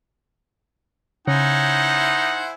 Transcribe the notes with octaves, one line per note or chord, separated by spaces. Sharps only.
C#3 D#4 E4 C5 F#5 G#5